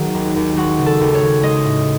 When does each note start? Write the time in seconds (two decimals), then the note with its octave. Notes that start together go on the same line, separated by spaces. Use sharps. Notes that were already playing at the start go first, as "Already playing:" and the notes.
Already playing: D#3 F#3 F#4 G#4
0.15 D#2
0.36 D#2
0.57 G#3 F#4
0.79 C#3
0.86 A4
1.00 D#2
1.14 C#5
1.22 D#2
1.43 G#3 D#5
1.65 A2